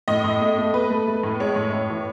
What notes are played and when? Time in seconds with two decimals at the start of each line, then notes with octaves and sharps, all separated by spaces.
0.08 A2 D#5
0.24 A2
0.41 A3
0.58 A3
0.73 A3 B4
0.90 A3
1.07 A3
1.23 A2
1.40 G#3 C#5
1.56 A2
1.73 A2
1.89 E3